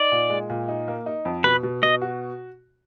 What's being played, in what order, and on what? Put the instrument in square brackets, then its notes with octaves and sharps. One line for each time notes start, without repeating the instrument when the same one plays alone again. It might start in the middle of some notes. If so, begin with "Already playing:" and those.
Already playing: [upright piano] D#4 [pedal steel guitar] D5
[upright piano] A#2
G#3
A#2
D#4
A#3
D#4
F2
[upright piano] B2 [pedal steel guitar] B4
[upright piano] B2
[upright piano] B2 [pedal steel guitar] D#5
[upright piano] F#4